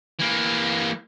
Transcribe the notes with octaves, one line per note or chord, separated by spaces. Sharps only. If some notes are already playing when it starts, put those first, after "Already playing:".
E3 A#3